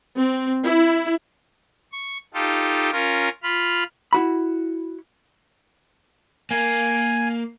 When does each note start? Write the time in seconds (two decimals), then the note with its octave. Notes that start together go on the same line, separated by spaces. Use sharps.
0.15 C4
0.63 E4
1.92 C#6
2.34 D#4 F4 G4 A4
2.92 C#4 F4 A#4
3.43 F4 B5 F6
4.13 E4 F#4 B5
6.51 A#3 A#4 G#5